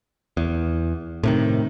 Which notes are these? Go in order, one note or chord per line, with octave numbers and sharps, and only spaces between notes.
E2
A2 C3 D#3